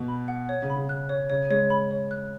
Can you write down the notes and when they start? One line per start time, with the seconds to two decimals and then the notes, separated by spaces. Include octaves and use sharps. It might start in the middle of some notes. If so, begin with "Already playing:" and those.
Already playing: B2
0.08 B5
0.28 F#5
0.49 C#5
0.62 C#3
0.70 B5
0.76 C#3
0.89 F#6
1.09 C#5
1.30 C#3 C#5
1.50 G#3 C#5
1.70 B5
1.91 C#5
2.11 F#6